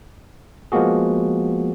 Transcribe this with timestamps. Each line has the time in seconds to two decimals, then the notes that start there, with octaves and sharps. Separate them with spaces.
0.72 F3 G#3 A#3 B3 F#4 G#4